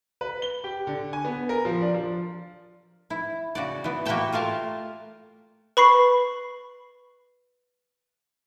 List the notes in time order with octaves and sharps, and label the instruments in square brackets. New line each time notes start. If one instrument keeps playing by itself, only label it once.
[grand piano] B4
G7
G4
D3
G#5
B3
A#4
F3
D4
F3
[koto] E4
C#3 F#4 D5
E3 B3
A#3 F#4 G4 F5 G5 A5
A3 F4 A#4 F5 A5
[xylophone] B4 B5 C#6 C7